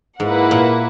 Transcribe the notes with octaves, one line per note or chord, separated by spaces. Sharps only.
G#2 A#3 E4 B4 F#5
A#2